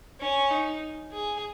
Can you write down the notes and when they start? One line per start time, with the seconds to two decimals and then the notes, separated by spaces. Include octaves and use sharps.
0.20 C#4
0.51 D#4
1.12 G#4